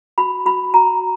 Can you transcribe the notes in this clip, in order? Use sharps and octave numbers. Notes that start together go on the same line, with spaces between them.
F#4 B5
F#4 B5
F#4 A#5